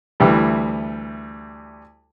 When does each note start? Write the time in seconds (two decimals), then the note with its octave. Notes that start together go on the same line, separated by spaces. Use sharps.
0.20 D2 E3 G3